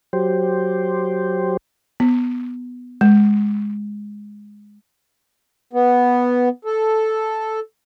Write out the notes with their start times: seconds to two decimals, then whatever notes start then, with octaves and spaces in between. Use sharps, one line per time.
0.13 F#3 G4 C5
2.00 B3
3.01 G#3
5.73 B3
6.65 A4